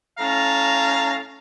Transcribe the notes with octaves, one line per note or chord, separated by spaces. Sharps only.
A2 C#4 F5 A5 A#5